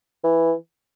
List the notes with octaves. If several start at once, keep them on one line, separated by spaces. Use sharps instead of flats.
E3